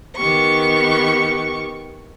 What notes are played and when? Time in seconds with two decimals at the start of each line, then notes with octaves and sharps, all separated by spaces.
0.17 D#3 B3 G4 C#6